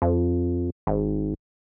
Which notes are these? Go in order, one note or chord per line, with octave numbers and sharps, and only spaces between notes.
F2
G#1